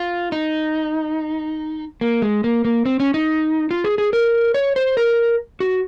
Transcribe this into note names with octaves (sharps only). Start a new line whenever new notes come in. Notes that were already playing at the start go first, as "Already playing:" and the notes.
Already playing: F4
D#4
A#3
G#3
A#3
A#3
C4
C#4
D#4
F4
G#4
G#4
A#4
C#5
C5
A#4
F#4